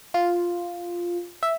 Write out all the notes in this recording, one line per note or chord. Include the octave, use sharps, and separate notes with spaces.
F4
E5